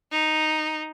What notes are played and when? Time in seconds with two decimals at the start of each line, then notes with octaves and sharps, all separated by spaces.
0.12 D#4